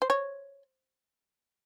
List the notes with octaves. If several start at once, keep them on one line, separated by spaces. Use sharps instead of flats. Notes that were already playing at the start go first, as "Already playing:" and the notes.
C5
C#5